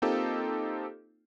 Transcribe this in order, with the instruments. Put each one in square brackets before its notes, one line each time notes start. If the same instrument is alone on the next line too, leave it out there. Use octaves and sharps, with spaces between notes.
[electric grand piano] A#3 C4 D#4 F4 G4 A4